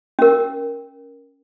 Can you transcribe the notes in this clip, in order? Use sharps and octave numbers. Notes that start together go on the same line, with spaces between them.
C#4 A#4